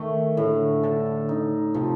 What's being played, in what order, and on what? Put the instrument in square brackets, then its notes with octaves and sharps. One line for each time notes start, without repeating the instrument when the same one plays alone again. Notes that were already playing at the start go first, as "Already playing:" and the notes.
Already playing: [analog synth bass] D#3 [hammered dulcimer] A3
[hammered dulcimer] A2 [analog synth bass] D3
[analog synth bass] D3 [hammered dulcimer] A4
[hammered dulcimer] D#4
[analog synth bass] C3 [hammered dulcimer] F3